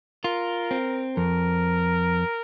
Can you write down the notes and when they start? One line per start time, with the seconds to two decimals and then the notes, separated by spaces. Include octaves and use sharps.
0.24 F4 A#4
0.71 C4
1.16 F2 A#4